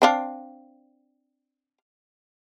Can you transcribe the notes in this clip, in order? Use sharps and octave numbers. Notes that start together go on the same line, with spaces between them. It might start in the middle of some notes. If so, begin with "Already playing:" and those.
C4 D4 F5